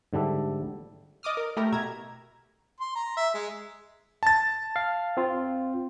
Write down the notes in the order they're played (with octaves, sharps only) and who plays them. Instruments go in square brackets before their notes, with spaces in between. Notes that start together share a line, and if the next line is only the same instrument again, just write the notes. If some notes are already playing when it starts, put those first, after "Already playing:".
[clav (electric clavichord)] G#2 D3 G3 D4 E5
[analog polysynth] D5 D#5 D6 D#6 F6
A#4
A3 E4 G4 A#4
B2 E5 A#5 G#6
[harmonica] C6
A#5
E5
G#3
[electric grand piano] A5 A6
[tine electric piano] F5
C4 F4